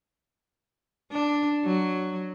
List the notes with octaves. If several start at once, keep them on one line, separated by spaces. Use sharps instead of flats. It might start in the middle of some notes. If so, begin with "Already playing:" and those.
D4
F#3